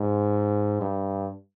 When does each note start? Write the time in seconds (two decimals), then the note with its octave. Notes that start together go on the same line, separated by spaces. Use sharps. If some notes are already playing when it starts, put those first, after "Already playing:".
Already playing: G#2
0.81 G2